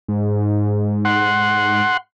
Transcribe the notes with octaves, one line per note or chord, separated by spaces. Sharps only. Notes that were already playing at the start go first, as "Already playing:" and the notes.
G#2
F#5 C6